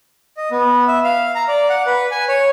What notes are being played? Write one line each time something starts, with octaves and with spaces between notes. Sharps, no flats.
D#5
B3
E5
F5
A#5
D5
F#5
B4
G#5
C#5